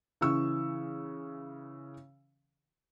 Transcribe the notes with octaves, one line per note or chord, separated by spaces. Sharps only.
C#3 E3 C#6 E6